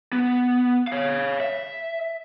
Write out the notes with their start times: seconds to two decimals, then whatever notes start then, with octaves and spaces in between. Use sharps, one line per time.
0.13 B3
0.88 C#5 F5
1.40 E5